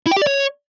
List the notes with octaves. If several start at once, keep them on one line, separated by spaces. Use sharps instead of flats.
E4
G5
G4
D5
C#5